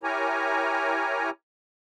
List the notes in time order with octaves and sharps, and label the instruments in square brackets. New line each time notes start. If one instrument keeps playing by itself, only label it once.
[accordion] E4 G4 A#4 C#5 G#5 A#5